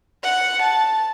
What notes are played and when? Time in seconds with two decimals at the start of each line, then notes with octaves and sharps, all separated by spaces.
0.23 F#5
0.62 A5